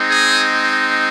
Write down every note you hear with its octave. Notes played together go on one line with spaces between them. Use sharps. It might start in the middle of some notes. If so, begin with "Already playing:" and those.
Already playing: G#3 C4 D#4
G#4